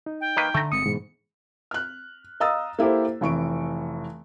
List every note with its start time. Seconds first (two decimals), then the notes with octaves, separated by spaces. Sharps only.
0.06 D#4
0.21 G5
0.37 D#3 A#3 B4
0.54 D3 A3 A#5
0.72 G1 G#3 C4 D#6 C#7
0.86 G#2 B2 E3
1.71 F6 F#6
2.40 D#5 F5 A#5 D#6 E6 A6
2.79 A#3 E4 G4 A4 C5
3.21 F1 E3 C#6 D7